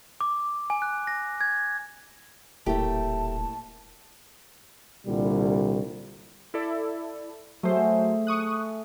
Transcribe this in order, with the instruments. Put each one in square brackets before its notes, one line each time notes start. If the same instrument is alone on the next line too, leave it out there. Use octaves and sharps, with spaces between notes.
[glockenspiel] D6
G#5
F#6
A#6
G#6
[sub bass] D#1 [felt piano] A2 A#3 E4 [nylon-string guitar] A3 G4 [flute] A5
[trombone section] C2 A#2 D3 G3
[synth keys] E4 A4 D5
[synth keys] F#3 C5 [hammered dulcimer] A3 G#4
[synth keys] C#6 D#6 F#6